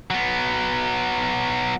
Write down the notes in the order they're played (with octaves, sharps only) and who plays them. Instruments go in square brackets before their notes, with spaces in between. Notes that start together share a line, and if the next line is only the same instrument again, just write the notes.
[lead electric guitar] F#3 B3